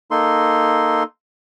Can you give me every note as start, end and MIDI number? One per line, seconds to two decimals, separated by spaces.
0.11 1.03 58
0.11 1.03 63
0.11 1.03 69
0.11 1.03 84